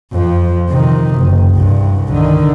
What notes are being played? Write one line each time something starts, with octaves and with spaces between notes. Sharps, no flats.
F2 F3
C3 D#3
F#1
C2 G2
D3 D#3